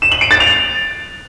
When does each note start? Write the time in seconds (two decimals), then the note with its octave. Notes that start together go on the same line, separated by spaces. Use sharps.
0.02 E7
0.12 F#7
0.21 D7
0.31 A6
0.40 F7